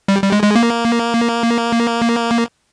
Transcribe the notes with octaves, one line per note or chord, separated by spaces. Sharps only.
G3
G3
G#3
G#3
A#3